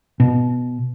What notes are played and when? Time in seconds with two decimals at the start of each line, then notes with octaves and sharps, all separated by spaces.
0.20 B2